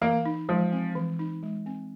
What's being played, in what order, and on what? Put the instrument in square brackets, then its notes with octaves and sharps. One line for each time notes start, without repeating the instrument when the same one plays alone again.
[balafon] E3 [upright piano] A#3
[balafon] D#4
[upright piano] F3 [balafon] G#3
[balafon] C4
E3
D#4
G#3
C4